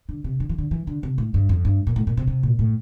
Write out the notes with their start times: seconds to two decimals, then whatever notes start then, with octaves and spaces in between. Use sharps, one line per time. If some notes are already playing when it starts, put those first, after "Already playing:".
0.09 D3
0.24 C3
0.40 D3
0.49 E3
0.58 D3
0.71 E3
0.87 D3
1.03 C3
1.18 A2
1.34 G2
1.49 F2
1.65 G2
1.87 A#2
1.96 A2
2.07 A#2
2.17 C3
2.28 C3
2.43 A#2
2.59 A2